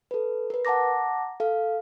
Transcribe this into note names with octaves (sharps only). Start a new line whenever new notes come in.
A4 B4
A#4 B4
F#5 A5 A#5 D6 A#6
A4 F5